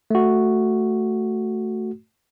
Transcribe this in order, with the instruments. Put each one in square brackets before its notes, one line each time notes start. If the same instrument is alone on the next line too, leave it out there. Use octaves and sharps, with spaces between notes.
[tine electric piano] A3 F#4